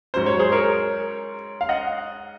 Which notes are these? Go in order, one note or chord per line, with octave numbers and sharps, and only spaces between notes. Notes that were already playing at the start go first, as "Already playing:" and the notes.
G#2 F#3 C#4 C5
C#5
G#4 C5
A#4 C#5
F5
D#5 F#5